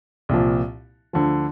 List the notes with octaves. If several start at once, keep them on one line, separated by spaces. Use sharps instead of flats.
C2 A#2 F3
D2 D3 F3